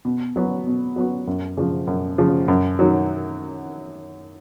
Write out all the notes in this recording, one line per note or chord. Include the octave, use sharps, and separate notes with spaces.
B2
F#3 B3 F#4
B2
F#3 B3 F#4
F#2
C#3 F3
F#2
C#3 F3
F#2
D#3 F#3